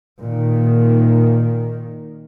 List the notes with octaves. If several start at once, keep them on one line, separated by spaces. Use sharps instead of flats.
A#2 D#3